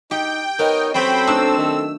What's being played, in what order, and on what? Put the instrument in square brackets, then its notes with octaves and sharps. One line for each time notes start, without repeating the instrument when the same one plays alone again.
[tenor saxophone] D#4 [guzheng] G4 [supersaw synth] G5
[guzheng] B3 [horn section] D#4 C#5 D#5 [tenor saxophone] A#4
[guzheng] F#3 C#4 E5 [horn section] C4 A4 [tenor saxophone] C5 [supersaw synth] G5 B5
[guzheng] A3 D4 D#4 [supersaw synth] E6
[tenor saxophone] D#3